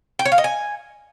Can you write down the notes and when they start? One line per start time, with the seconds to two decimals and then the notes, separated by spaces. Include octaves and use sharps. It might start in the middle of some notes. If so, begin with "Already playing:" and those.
0.19 G5
0.25 C#5
0.32 F5
0.38 D#5
0.44 G#5